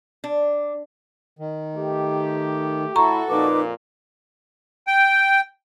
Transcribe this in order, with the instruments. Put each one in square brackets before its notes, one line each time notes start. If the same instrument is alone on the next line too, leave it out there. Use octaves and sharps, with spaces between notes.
[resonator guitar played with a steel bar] D4
[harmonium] D#3
[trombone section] A3 G4
[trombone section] A2 E4 [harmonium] F#4 A4 [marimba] A#5 C#6
[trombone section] F2 A#2 [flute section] D#4 B4 D6
[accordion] G5